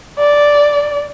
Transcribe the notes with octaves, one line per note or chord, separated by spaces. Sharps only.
D5